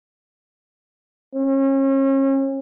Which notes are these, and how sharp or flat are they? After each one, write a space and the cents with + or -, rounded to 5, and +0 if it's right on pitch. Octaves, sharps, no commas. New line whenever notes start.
C#4 -35